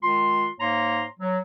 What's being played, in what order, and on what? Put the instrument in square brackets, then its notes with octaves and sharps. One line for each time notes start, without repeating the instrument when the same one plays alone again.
[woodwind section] D#3 G#3 F4 C6
G#2 A#3 C#5 A#5 C6
F#3